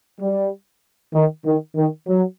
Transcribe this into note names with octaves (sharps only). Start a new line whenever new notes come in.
G3
D#3
D#3
D#3
F#3